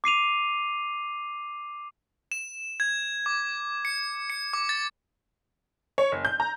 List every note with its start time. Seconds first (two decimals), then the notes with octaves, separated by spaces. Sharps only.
0.04 D6 C7 D#7 F7
2.32 E7
2.80 G#6
3.26 D6
3.85 C#7
4.30 C#7
4.53 D6
4.69 A6
5.98 C#5
6.12 F#1
6.25 G6
6.40 A#5